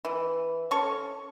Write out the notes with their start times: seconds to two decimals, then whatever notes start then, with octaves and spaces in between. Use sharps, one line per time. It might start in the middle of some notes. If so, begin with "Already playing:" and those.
0.05 E3
0.71 C#4 A4 C#5 C#6